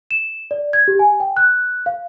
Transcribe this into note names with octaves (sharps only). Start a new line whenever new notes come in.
E7
D5
G#6
G4
G#5
G5
F#6
F5